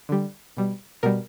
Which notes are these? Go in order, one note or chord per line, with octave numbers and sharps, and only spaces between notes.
D3 G3
B2 G3
B2 G3 A#4